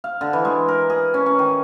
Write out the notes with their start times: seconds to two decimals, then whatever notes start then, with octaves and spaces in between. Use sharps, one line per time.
0.04 F5
0.21 D3
0.33 E3
0.45 G#3
0.68 A#4
0.90 G#4
1.14 C#4
1.26 C#4
1.39 D#3